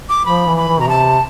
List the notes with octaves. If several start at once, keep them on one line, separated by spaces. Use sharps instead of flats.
D6
F3 B5
E3
B5
E3
B2 A#5
C3 A5